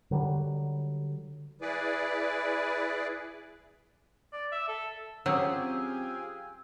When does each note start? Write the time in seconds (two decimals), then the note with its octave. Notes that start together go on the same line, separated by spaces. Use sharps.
0.11 D3 F#3 G3
1.61 E4 G#4 B4 D5
4.32 D5
4.52 E5
4.68 A4
5.26 F#3 C4 C#4 F4 G4 G#4 E6